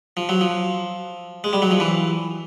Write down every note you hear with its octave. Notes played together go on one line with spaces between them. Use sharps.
F3
F#3
F3
G#3
G3
F#3
F3
E3